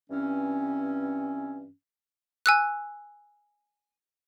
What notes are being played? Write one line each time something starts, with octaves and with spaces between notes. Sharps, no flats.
G2 E3 C4 C#4
G#5 E6 F#6